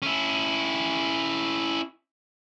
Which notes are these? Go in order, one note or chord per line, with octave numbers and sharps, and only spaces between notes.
C#4 E4